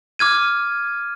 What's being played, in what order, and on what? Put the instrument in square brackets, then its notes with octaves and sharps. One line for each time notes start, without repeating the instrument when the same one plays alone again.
[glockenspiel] D6 F6 G#6 D#7